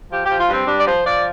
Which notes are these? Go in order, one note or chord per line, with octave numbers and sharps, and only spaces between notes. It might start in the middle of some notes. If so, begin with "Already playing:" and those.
F3 G4
G4
F3
F4
G2 C4
G2 D4
D5
F3 C5
F3 D5